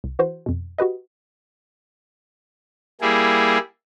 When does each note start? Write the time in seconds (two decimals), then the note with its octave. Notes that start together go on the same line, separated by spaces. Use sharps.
0.04 C2
0.19 E3 F#4 C5
0.46 F2 B2
0.78 F#4 G4 B4 D#5
3.01 G3 A#3 E4 G#4